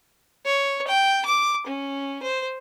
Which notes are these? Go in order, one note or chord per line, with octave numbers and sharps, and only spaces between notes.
C#5
G5
D6
C#4
C5